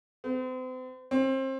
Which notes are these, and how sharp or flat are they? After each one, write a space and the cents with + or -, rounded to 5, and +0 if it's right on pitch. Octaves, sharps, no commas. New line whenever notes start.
C4 -40
C4 +30